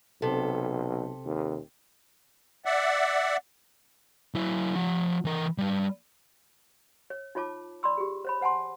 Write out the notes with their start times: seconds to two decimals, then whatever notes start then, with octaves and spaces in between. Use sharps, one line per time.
0.22 B1 C3 A4
1.26 D#2
2.66 D5 E5 F#5
4.34 F#3 E4
4.75 F3 F#5
5.25 E3 A#4
5.58 G3 B4
7.10 C#5
7.35 D#4 F4 C#5 A5 D6
7.83 D5 B5 C6 E6
7.98 G4 G#4
8.25 C5 C#5 B5
8.41 C5 F#5 G#5 A5 C6